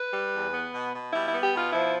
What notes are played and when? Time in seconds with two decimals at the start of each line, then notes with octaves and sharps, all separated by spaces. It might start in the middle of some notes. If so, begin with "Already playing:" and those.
Already playing: B4
0.13 G3
0.33 E2
0.53 B3
0.73 B2
0.93 B2
1.13 G3 E4
1.27 E4
1.33 B3
1.43 G4
1.53 B2 F4
1.72 F3 E4